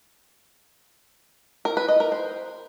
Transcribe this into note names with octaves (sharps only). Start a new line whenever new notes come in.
A#4
B4
D#5
A#4
C5